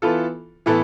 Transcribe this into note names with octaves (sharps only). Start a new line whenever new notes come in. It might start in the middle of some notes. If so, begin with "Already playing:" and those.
E3 B3 F4 A4
A2 E3 B3 E4 A4